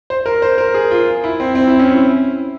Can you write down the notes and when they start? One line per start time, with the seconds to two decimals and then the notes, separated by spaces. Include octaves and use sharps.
0.10 C5
0.26 A#4
0.42 C5
0.58 A#4
0.74 G#4
0.91 F4
1.24 E4
1.40 C4
1.55 C4
1.68 E4
1.79 C#4
1.91 E4